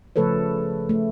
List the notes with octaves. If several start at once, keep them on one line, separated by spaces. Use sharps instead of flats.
C#3 F3 A3 A4 B4 C#5
A3